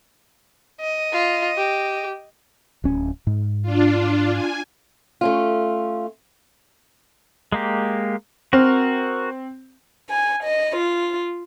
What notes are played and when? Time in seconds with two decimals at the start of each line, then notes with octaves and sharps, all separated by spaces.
0.80 D#5
1.13 F4
1.57 G4
2.84 D1 C#4
3.27 G#2
3.62 D4 F4
4.31 G#5
5.21 A3 C#4 F4
7.52 G#3 A#3 G4
8.53 C4 F#4 A#4 F6
10.09 G#5
10.44 D#5
10.76 F4